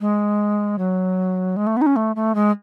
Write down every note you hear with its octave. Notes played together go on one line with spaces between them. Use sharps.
G#3
F#3
G#3
A3
B3
D#4
C#4
A3
A3
G#3